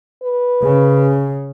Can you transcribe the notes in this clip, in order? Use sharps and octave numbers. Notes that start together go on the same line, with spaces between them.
B4
C#3